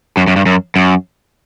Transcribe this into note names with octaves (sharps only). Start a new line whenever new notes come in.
F#2
F#2
G2
F#2
F#2